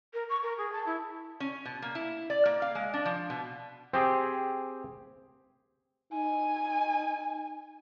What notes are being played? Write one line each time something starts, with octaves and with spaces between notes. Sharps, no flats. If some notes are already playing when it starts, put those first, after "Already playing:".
A#4
C#6
A#4
G#4
A5
E4
C#4
B2
A#3
E4
D5
A#3
F5
G#3
D4
F3
B2
C4 G4 G#4
D#4 G#5